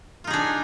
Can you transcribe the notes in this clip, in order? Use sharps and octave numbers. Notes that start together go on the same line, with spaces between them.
D4 D#4 F4 G#4